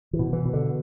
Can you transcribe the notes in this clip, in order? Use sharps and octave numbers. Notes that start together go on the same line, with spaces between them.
E3
B2
E3
B2
D3